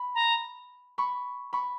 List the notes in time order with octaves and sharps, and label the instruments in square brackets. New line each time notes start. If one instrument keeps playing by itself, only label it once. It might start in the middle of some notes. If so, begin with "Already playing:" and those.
Already playing: [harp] B5
[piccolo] A#5
[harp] B5 C#6
B5 C#6